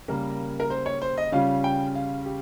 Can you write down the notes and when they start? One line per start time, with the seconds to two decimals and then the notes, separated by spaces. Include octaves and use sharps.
0.08 C#3 G3 A#3 A#4
0.60 A#4
0.70 C5
0.86 C#5
1.02 C5
1.18 D#5
1.32 C#3 G3 C#4 F4 F5
1.64 G5
1.95 F5
2.26 G4